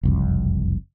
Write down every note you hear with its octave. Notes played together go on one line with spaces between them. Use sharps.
F#1 C2 F2